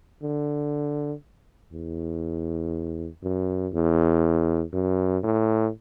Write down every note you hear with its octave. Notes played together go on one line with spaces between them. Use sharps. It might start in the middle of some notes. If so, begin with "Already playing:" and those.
D3
E2
F#2
E2
F#2
A2